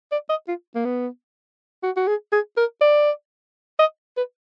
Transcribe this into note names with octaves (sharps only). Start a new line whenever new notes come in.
D5
D#5
F4
A#3
B3
F#4
F#4
G#4
G#4
A#4
D5
D#5
B4